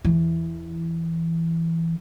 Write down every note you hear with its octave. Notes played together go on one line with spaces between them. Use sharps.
E2 E3